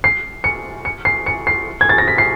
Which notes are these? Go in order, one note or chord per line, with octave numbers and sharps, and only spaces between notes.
C7
C#7
C#7
C7
C#7
C7
G#6
A6
A#6
B6
C7